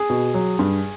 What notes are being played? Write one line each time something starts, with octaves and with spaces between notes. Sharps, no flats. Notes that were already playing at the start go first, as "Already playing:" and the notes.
Already playing: G#4
B2
F#3
G2